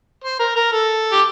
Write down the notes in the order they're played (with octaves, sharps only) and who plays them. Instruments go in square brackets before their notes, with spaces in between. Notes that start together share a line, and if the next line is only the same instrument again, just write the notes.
[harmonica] C5
A#4
A#4
A4
G4